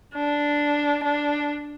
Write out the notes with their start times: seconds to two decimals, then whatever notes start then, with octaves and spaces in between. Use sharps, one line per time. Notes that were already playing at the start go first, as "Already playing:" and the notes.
0.14 D4
1.04 D4